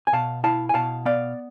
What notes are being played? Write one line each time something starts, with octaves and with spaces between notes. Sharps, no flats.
G#5
B2 F5 A5
E4 F5 A5
G#5
B2 F5 A5
B3 D5 F5